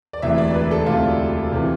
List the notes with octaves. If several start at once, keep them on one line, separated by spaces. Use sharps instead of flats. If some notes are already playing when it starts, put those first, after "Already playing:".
D5
E1 D2 C3 E3 E5
D5
B4
A4
E1 D2 C3 E3 F4
C3 E3